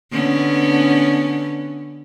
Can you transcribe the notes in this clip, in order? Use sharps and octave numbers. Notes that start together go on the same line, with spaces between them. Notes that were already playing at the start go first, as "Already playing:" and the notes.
D3 B3 C#4